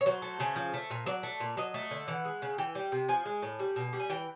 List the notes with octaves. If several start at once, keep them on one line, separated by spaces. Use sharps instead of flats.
C#5
F#3 C5
A3
C#3
F3
A3
A#2
F#3 D5
A3
A#2
F#3 D#5
A3
D3
E3 F#5
G#3
C#3
E3 G5
G3
C3
F3 G#5
G#3
A2
G3
B2
G3
G#5
E3 G5